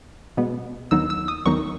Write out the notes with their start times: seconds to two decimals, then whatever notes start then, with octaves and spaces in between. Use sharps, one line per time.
0.37 B2 G#3 B3
0.91 D#2 D#3 F#3 B3 D#4 E6
1.10 E6
1.28 D#6
1.45 D#2 D#3 F#3 B3 D#4 C#6